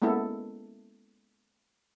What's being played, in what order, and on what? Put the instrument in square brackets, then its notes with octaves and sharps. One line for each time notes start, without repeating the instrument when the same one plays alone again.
[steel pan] G#3 A#3 B3 C#4 E4 A4